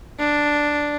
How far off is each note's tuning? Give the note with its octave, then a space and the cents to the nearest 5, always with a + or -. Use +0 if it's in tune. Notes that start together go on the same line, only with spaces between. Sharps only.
D4 +0